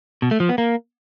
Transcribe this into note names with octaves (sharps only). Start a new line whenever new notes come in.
B2
A3
F3
B3
A#3